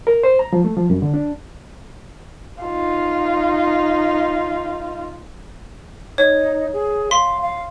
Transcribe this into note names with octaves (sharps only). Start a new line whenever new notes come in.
A#4
C5
A#5
F3
A3
F3
F#2
D3
D4
D#4 F4
D#4 C#5
G#4
F5 C6 B6
F5